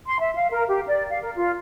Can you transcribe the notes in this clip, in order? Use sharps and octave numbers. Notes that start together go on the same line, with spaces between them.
C6
E5
F5
A#4
G4
D5
F5
A#4
F4